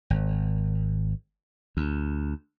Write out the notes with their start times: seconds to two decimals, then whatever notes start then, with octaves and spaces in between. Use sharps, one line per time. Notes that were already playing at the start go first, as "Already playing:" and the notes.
0.10 G#1
1.77 D2